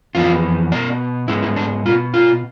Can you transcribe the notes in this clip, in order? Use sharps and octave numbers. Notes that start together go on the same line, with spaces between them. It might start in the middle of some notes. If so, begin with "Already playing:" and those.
F2 E3 B3 F4
B2 B3 D5
G#2 G#3 B3 E4
E4
D4
B2 B3 F4
F4